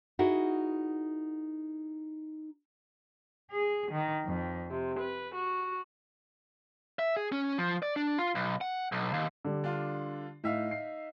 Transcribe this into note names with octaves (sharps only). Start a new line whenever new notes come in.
D#4 E4 F#4 G#4 A#4
G#4
D#3
F2
C3
B4
F#4
E5
G#4
C#4
F3
D5
D4
F4
B1
F#5
B1
D#2
D3 G3
D4 F4
A2 D#4 E5 F5
C7